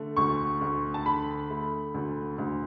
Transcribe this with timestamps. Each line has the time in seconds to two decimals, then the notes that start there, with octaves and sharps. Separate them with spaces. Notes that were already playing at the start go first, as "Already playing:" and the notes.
Already playing: D3 A3
0.17 D2 C#6
0.61 D2
0.94 A5
1.06 D3 B5
1.50 A3
1.94 D2
2.38 D2